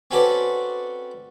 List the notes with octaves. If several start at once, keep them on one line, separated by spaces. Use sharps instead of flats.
C4 C#4 F#4 A4 B4 D5